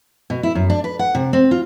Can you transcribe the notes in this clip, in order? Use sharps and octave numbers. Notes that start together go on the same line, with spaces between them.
B2
E4
F#2
D4
B4
F#5
C3
C4
F4